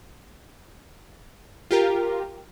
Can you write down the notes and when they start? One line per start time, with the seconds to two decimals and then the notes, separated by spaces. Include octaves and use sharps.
1.71 F4 G4 A#4